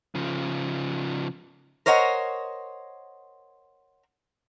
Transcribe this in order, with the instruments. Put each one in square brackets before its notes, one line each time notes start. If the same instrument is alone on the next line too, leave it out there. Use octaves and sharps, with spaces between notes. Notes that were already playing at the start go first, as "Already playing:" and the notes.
[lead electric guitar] C#3 F3
[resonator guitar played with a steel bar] A#4 C5 C#5 D#5 F#5